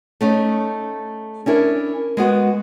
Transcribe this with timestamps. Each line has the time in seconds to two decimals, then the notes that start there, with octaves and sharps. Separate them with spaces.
0.21 A3 C#4 D#4
1.46 C#4 D4 E4 A#4
2.17 G#3 B3 F#4